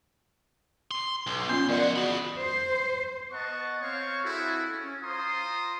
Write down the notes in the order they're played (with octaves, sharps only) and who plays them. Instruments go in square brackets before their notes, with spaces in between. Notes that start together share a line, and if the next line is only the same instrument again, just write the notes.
[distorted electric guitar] C6
B1
[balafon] B3 C#4 F4 [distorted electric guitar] C6
[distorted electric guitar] F3 F#5 [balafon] A#4 D5 D#5
[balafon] F#4 [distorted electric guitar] G#4 B5
[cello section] C5
[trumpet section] B3 D#5 F#5 A5 C#6
C4 C5 C#5 F5 C#6
C4 E4 F#4 G#4 A4
C#4
F4 C5 A#5 C6 D#6